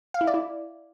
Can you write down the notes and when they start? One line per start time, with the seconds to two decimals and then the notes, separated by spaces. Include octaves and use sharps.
0.14 F5
0.21 E4
0.27 D5
0.34 E4